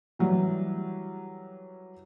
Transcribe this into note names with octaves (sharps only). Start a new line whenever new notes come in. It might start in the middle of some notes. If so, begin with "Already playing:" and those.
E3 F#3 G3